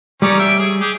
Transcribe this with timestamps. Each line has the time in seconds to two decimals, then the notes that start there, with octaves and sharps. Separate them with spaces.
0.22 G3 C#4 D#4 D5
0.39 E5 G5
0.59 G#4
0.81 G4 G#4